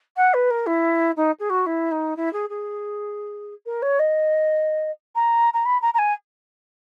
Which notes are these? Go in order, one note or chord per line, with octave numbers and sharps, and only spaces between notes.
F#5
B4
A#4
E4
D#4
G#4
F#4
E4
D#4
E4
G#4
G#4
A#4
C#5
D#5
A#5
A#5
B5
A#5
A#5
G#5